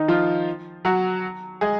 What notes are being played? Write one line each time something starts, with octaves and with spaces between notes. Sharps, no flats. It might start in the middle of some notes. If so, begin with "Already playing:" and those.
Already playing: D#3 D#4
F3 F4
F#3 F#4
G#3 G#4